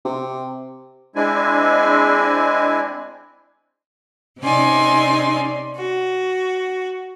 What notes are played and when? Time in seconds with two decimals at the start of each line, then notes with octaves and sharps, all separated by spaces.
0.05 C3
1.16 G#3 C4 D4 E4 G#5
4.41 C3 C#4 D#4 D5 G#5 C6
5.76 F#4